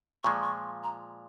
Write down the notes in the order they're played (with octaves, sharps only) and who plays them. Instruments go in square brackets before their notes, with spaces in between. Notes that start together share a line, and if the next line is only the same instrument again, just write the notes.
[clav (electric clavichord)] A#2 F3 G#3 [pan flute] C#6
[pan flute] C#6
A#5